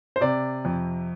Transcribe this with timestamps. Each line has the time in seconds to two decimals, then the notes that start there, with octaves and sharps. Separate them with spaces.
0.16 C5
0.21 C3 D5
0.65 F2